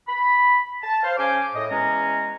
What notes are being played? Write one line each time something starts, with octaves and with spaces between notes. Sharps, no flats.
B5
A5
C5 F5
C#3 C#4 C5 G#5 D6
A2 D#5
E2 G#3 C#4 A#5